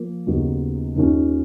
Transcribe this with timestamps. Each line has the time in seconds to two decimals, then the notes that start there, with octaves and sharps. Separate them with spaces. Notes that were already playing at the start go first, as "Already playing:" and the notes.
Already playing: F3 A#3
0.27 D#2 C#3 F#3 B3 D#4
0.96 D#2 D#3 A#3 C#4 F4